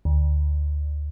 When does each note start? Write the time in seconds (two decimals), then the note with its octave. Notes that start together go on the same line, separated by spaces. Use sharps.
0.05 D2